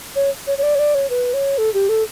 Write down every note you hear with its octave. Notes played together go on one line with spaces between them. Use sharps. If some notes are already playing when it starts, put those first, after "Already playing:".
C#5
C#5
C#5
D5
C#5
D5
C#5
B4
C#5
A4
G4
A4